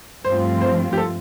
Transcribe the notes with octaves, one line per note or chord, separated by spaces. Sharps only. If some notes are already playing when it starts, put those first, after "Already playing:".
G2 F3 A3 C4 F4 C5
C5
G4
A4